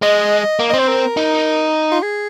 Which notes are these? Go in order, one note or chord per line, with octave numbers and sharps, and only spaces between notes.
G#3 D#5
A#3
C4 D#5
C5
A#4
D#4
F4
G#4